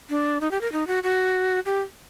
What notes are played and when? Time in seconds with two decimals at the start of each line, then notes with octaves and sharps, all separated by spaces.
0.10 D4
0.41 D#4
0.51 G4
0.61 A#4
0.72 D#4
0.87 F#4
1.03 F#4
1.66 G4